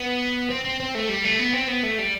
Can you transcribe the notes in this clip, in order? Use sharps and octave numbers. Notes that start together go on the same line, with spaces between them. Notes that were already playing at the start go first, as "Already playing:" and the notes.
Already playing: B3
C4
C4
C4
A3
G3
A3
B3
C4
B3
A3
G3